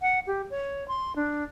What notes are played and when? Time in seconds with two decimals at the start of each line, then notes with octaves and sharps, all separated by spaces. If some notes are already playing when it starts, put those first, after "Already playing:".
0.02 F#5
0.27 G4
0.50 C#5
0.88 C6
1.16 D4